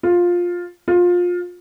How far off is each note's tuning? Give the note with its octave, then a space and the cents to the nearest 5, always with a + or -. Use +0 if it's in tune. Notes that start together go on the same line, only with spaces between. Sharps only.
F4 +10
F4 +20